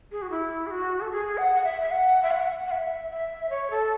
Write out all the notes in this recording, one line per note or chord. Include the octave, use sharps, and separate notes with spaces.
G#4
F#4
E4
G#4
F#4
A4
G#4
F#5
F#5
E5
E5
F#5
E5
F#5
F#5
E5
E5
C#5
A4